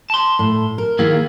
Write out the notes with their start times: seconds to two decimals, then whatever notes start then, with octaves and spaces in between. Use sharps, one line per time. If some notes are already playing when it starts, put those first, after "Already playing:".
0.10 A5 C6
0.39 A2
0.78 A#4
0.99 D#3 A#3 E4 G#4